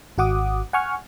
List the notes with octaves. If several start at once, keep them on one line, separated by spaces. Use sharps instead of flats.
G#1 F#4 F#5 D6 D#6
F#5 G#5 C#6 F6